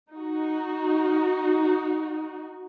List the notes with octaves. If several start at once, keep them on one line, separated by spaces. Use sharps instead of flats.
D#4 F#4